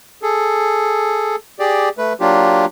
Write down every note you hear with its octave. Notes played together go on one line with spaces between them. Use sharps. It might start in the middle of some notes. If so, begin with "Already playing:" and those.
G#4 A4
G4 G#4 D5
A3 B4
F#3 A#3 D4 F4 G4